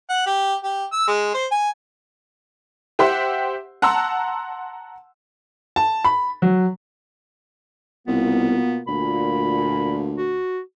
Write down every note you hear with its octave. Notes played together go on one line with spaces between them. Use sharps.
F#5
G4
G4
E6
G#3
C5
G#5
G4 C5 E5 F#5 C6
F#5 A5 A#5 C6 E6
A5
B5
F#3
C2 B2 A#3 B3 F4
D2 A#2 B5
F#4